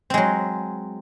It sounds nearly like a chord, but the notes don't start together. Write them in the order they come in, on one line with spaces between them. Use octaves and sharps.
C4 G#3 F#3